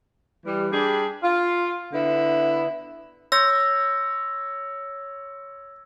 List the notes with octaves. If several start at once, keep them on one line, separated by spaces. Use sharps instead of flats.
E3 G3
G3 D4 G#4
F4
D3 B3 E4
C#5 C6 E6 G6 A#6